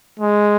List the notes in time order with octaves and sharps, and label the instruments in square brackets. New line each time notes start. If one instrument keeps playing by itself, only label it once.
[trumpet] G#3